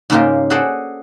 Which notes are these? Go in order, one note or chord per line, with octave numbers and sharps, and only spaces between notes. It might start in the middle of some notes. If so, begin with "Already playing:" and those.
G#2 C#3 G#3 A#3 F4 G4
F#4 G#4 A4 C5 D5